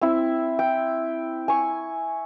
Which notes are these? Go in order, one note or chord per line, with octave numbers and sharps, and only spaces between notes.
C4 E4
G5
G#5 C#6